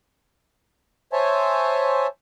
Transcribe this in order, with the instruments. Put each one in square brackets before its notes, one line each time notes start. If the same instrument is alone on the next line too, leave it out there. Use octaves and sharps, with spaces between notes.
[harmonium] C5 C#5 E5 G#5 A5